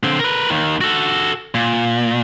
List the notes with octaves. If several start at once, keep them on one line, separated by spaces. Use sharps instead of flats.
D3 C4
A#4 B4
D#2 D#3
F#4 A4
A#2